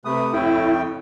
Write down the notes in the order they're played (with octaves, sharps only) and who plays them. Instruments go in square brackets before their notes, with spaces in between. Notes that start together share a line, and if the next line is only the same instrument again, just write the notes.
[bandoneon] C3 A3 D#6 [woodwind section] B4
[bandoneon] F2 G5 [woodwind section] A2 C#3 [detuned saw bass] E4